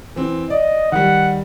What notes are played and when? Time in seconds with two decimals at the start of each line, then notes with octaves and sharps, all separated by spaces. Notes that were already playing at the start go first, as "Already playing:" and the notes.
0.16 E3 C4
0.50 D5 D#5
0.92 D#3 G3 F#5